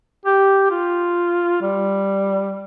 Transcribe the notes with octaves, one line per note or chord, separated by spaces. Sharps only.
G4
F4
G3